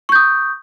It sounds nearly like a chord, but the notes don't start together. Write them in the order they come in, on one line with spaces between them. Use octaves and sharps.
C#6 G6 D#6